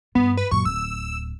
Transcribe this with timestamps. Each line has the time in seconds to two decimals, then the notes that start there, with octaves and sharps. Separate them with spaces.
0.15 G2 B3
0.37 B4
0.51 F#2 A#2 C#6
0.65 D1 E6